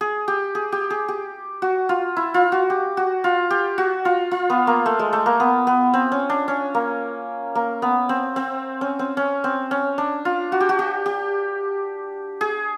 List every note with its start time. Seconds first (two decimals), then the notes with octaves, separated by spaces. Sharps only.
0.01 G#4
0.28 G4
0.55 G#4
0.72 G4
0.90 G#4
1.08 G4
1.62 F#4
1.89 F4
2.17 E4
2.34 F4
2.52 F#4
2.70 G4
2.97 F#4
3.24 F4
3.51 G4
3.78 F#4
4.05 F4
4.31 F4
4.50 B3
4.67 A#3
4.86 A3
4.99 G#3
5.13 A3
5.26 A#3
5.40 B3
5.67 B3
5.94 C4
6.12 C#4
6.30 D4
6.48 C#4
6.74 A#3
7.55 A#3
7.82 B3
8.09 C4
8.36 C4
8.81 C#4
8.99 C4
9.17 C#4
9.44 C4
9.71 C#4
9.98 D4
10.25 F4
10.52 F#4
10.60 G4
10.69 F#4
10.79 G4
11.06 G4
12.41 G#4